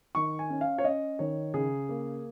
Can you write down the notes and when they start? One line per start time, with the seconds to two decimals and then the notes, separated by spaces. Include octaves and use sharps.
0.15 D#3 C#6
0.39 G#5
0.50 C#4
0.61 F5
0.78 C#5
0.84 C#4 D#5
1.19 D#3 C#5
1.54 C#3 G#4
1.89 A#3